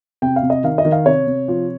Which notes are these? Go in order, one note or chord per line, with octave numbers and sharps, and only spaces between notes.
C3 G5
F5
C3
D#5
D#3 F5
D#5
D#3
F5
C3 C#5
C3
F3